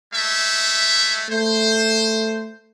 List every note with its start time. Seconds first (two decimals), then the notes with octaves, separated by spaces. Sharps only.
0.13 G#3 A3 E5
1.30 A3 C5